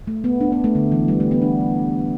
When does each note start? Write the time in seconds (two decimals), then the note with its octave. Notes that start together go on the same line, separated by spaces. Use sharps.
0.07 A3
0.24 B3
0.41 D4
0.52 B3
0.64 A3
0.75 D3
0.92 E3
1.08 G3
1.20 A3
1.31 B3
1.42 D4